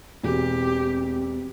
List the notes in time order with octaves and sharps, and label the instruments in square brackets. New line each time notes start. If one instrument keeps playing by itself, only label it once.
[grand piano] E1 [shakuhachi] C4 [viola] G4